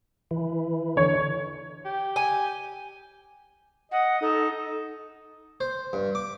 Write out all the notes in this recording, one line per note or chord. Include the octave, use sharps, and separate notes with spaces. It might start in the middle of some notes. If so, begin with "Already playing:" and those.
E3
D3 C#5
G4
G#5
D#5 F#5
D#4 A4
C5
G2
D6